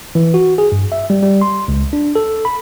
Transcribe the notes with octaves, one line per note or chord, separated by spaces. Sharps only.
E3
F#4
G#4
G2
E5
G3
G3
C6
C#2
D4
A4
B5